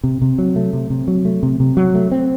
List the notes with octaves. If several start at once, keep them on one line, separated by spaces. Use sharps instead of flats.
C3
C3
F#3
A3
C3
C3
F#3
A3
C3
C3
F#3
A3
C4